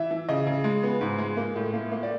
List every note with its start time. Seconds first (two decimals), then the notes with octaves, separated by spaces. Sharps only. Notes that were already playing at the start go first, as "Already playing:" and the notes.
Already playing: E3 E5
0.11 E3
0.29 C#3 D#5
0.47 C#3
0.64 G#3
0.83 B3
1.01 G#2
1.19 G#3
1.37 A#3
1.56 A2
1.73 A#3
1.92 A#3
2.03 D5